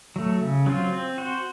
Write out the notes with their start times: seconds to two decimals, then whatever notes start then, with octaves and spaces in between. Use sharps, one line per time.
0.16 F#3 A3
0.41 C#3
0.66 F#3 C4 F4
0.93 C4
1.18 F#4 C5